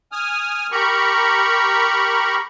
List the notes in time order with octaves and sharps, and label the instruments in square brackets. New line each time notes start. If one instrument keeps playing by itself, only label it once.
[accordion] G#5 D#6 F6
G4 A#4 A#5 B5 C#6